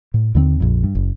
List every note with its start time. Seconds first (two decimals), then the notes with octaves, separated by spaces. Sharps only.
0.14 A2
0.35 D#2 D3 A3 C4
0.60 A#1 F2
0.83 G2
0.95 F#1